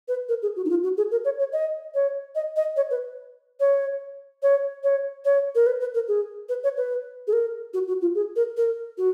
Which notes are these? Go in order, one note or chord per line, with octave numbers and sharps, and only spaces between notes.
B4
A#4
G#4
F#4
D#4
F4
F#4
G#4
A#4
C#5
C#5
D#5
C#5
D#5
D#5
C#5
B4
C#5
C#5
C#5
C#5
A#4
B4
B4
A#4
G#4
B4
C#5
B4
G#4
A#4
F#4
F#4
F4
G#4
A#4
A#4
F#4